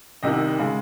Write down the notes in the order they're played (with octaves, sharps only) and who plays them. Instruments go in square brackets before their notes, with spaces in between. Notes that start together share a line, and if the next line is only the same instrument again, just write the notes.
[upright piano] C2 C3 D#3 D#5
C#3 G#3